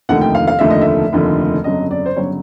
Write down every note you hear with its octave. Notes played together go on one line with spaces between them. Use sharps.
F1 D#2 D3 F3 A3 F#5
G5
F5
F5
F1 D#2 D3 F3 A3 E5
D#5
E5
F1 D#2 D3 F3 A3
G1 F2 C#3 F#3 D#5
D5
C5
G1 C#3 F#3 C#5